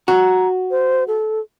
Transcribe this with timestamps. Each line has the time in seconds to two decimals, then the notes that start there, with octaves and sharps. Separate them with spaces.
0.08 F#4 A#5
0.71 C5
1.08 A4